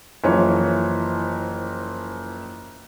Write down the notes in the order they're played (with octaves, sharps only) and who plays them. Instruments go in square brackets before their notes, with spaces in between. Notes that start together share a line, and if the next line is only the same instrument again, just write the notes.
[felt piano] F#1 E3 F3 C#5